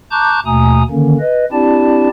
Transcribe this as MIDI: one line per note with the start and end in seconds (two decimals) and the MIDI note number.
0.11 0.40 81
0.11 0.40 82
0.11 0.40 85
0.11 0.40 86
0.11 0.40 90
0.11 0.40 91
0.46 0.83 39
0.46 0.83 47
0.46 0.83 57
0.46 0.83 80
0.46 0.83 82
0.46 0.83 87
0.91 1.17 50
0.91 1.17 51
0.91 1.17 58
0.91 1.17 61
1.20 1.45 71
1.20 1.45 75
1.52 2.08 60
1.52 2.08 62
1.52 2.08 64
1.52 2.08 67
1.52 2.08 74
1.52 2.08 81